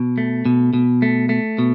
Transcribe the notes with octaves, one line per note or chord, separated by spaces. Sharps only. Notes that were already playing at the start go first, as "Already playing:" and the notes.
Already playing: B2
A3
B2
B2
A3
A3
B2